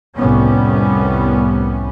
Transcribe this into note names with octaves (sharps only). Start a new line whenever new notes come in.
C2 F2 A2 G3 B3 C#4